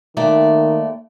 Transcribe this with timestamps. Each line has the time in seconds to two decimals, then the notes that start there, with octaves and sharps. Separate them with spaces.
0.17 D#2 D#3 A3 D5